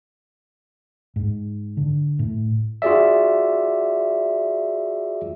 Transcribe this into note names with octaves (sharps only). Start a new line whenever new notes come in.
G#2
D3
A2
F4 F#4 G#4 D5 E5